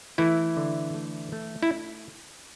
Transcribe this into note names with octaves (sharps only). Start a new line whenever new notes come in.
E3 A3 E4
D3
A3
A3
E4